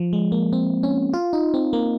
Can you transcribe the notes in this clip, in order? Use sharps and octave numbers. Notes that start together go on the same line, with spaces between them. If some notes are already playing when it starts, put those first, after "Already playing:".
Already playing: F3
G#3
A#3
C4
C#4
F4
D#4
C4
A#3